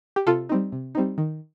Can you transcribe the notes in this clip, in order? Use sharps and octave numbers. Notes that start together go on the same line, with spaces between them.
G4
C3 F4 A4
G3 C4 D#4
C3
G3 C4 D#4
D#3